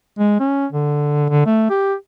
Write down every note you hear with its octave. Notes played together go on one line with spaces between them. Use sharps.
G#3
C#4
D3
D3
A3
G4